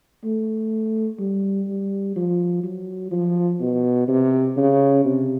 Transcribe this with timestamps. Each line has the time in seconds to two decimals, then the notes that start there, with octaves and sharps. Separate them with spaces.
0.24 A3
1.19 G3
1.68 G3
2.16 F3
2.64 F#3
3.11 F3
3.61 B2
4.08 C3
4.57 C#3
5.05 C3